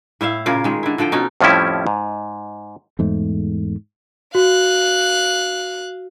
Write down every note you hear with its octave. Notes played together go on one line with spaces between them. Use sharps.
A2 E4 E5 F5
A#2 C#3 F4 A#4
D#3 G#3
D3 E4
D3 F3 A4 G5
B2 C#4 D#4
F2 A2 F3 G3 C#4 E4
G#2
E2 G#2 A3
F#4 F5 F#6